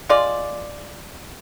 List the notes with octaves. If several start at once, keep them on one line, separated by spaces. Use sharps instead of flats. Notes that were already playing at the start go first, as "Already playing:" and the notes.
G#3 F4 D5